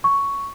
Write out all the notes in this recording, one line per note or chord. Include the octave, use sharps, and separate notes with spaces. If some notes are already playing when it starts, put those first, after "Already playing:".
C#6